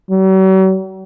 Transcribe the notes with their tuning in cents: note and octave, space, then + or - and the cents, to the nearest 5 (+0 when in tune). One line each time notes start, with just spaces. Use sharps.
F#3 +45